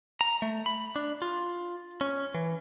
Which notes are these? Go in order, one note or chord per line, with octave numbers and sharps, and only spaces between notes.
A#5
A3
B5
D4
F4
C#4
E3